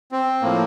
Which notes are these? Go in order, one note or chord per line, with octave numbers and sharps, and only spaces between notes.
C4
A2 F3 A#3